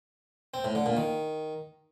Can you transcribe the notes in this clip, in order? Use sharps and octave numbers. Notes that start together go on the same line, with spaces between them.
C4
A2
D3
A#2
D#3